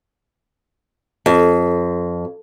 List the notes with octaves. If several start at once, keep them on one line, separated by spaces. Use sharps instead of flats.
F2